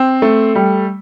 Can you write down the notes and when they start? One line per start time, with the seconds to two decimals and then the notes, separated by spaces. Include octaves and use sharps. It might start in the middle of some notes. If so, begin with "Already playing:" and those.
Already playing: C4
0.22 A3
0.55 G3